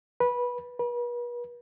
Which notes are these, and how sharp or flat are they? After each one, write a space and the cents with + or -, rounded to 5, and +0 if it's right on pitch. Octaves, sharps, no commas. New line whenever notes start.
B4 -15
B4 -40